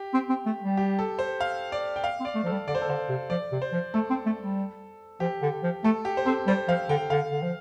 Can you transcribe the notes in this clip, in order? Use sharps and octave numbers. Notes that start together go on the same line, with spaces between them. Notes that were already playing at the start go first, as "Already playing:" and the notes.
Already playing: G4
C4
C4
A3
G3
G4
A4
C5
F5
D5
G5
F5
C4
D5
A3
F3 A4
G3
D3 D5
C5
A4
D3 C5
C3
F3 D5
C3
C5
F3
A3 A4
C4
A3
G3
F3 G4
D3
F3
A3 A4
G4
C5
C4 A4
G3 C5
F3 F5
D3 G5
D3 F5
D3
F3